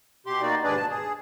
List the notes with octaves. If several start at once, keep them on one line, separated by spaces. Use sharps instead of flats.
B2 G4 C6
A#3 D#4 F#4 D5
D#2 G#2 D4 G#4 B4 D5
B2 A5
G#4